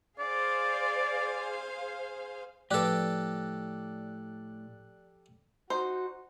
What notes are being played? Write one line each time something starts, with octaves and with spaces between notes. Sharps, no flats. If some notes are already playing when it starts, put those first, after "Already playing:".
G#4 C5 D5 F5
A2 F3 G4 A4 B4 D5 F#6
D#4 F#4 C5